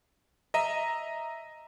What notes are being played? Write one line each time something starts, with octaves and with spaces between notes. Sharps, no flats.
D#5 E5 A#5 D#7